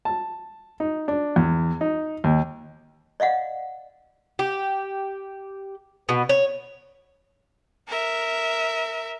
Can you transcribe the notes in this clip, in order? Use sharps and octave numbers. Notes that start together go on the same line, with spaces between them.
A5
D#4
D4
E2
D#4
D#2
D5 D#5 F5 F#5
G4
B2
C#5
A#4 E5